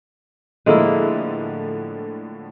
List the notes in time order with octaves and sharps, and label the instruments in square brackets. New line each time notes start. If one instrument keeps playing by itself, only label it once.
[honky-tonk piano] A2 D3 F3 [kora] G#3 A#3 E4